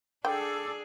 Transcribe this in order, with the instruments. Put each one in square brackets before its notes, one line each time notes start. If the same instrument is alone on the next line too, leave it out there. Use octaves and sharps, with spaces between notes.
[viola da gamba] D4 G#4 [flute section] A4 D6 E6 [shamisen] G5